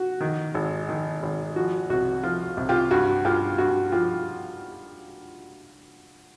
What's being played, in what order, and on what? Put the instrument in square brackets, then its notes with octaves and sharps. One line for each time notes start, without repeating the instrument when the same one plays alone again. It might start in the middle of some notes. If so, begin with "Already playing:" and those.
Already playing: [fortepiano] F#4
D#3
G#1
D#3
G#1
F3 F#4
C2 F#4
F3 F4
C2
F4 G4
G2 F#4
G2 F4 G4
G2 F#4
F3 F4 G4